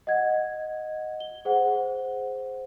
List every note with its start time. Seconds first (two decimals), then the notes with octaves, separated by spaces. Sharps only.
0.07 D#5 F#5 G#6
1.20 G7
1.45 G#4 C5 F#5